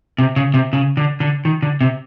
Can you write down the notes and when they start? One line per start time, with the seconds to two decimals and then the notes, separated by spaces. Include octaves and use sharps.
0.18 C3
0.36 C#3
0.54 C3
0.73 C#3
0.97 D3
1.20 D3
1.45 D#3
1.63 D3
1.81 C3